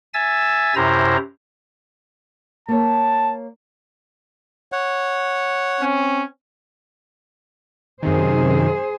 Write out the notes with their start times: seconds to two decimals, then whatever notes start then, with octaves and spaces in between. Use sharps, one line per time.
0.14 E5 G#5 E6 A6
0.76 F#2 C3 E4 C5 A#5
2.68 A#3 C#5 A5
4.72 C#5 F#5
5.81 C4 C#4
8.02 F#2 C3 D#3 G#4 C5